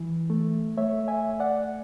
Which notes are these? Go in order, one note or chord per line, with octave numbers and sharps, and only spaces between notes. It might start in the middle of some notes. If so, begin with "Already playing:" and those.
Already playing: E3
A3
A3 C#5 E5
E5 G#5
D2
D5 F#5